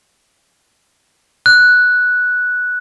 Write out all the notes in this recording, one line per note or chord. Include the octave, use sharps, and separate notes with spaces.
F#6